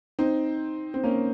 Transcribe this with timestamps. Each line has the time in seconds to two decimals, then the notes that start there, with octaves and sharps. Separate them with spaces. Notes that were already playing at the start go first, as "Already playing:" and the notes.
0.19 C4 D#4
0.94 C4
1.04 A#3 C#4